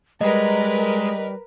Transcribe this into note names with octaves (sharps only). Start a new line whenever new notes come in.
G3 G#3 A#4 B4 D#5